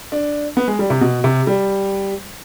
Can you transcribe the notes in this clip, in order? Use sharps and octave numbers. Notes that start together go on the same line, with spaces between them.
D4
B3
G#3
G3
C3
B2
C3
G3